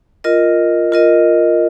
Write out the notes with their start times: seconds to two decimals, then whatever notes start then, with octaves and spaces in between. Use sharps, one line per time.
0.24 F4 A#4 D#5
0.92 F4 A#4 D#5